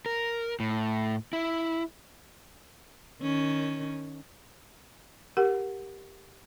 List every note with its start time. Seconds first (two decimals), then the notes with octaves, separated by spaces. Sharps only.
0.06 A#4
0.60 A2
1.33 E4
3.21 D#3 C#4
5.37 G4 A#4 F#5